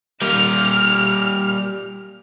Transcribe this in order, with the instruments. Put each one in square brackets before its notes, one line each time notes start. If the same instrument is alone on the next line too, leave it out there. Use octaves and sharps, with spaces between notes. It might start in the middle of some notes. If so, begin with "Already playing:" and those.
[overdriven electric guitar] G3 A#3 [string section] F6